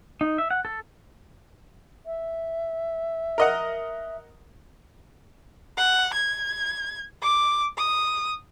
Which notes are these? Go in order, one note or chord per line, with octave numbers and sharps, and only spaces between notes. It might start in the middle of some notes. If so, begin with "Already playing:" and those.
D#4
E5
F#5
A4
E5
A#4 D#5 F#5
F#5
G#6
D6
D#6